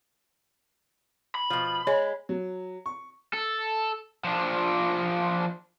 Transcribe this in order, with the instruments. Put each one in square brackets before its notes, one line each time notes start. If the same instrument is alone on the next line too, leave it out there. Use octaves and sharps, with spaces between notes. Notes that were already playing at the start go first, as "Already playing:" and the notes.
[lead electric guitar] B5
[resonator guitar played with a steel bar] B2 F3
[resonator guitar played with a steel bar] G#3 [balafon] C#5
[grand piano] F#3
C#6
[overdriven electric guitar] A4
F3 D4